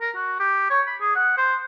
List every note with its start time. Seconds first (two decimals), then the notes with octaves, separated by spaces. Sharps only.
0.01 A#4
0.15 F#4
0.40 G4
0.70 C#5
0.87 B5
1.00 G#4
1.16 F#5
1.37 C5